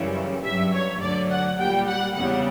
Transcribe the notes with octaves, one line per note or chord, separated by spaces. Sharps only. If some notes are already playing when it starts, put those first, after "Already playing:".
Already playing: F#2 C#3 E3 G3
G2 F#3 E5
C#5
D2 D3 F#3 D5
F#5
A#2 G3 G5
F#5
E2 C#3 G3 F#5